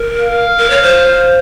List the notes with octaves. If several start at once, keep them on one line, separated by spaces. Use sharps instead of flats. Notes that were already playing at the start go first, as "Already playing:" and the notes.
Already playing: A#4
F5
A#4
C#5
C5